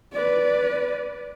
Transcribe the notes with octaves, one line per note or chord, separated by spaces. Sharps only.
B4 D5